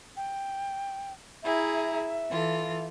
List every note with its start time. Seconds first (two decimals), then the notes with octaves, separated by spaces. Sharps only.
0.17 G5
1.43 E4 G#4 E5 A#5
2.28 E3 F4 A4